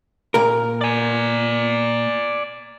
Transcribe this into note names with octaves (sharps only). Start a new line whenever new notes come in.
A#2 A#4
D5 G#5